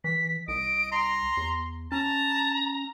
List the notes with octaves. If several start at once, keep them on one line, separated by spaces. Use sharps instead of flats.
E3 B6
C2 D#5 D7
A#5 C6
E2
C#4 A5 A#5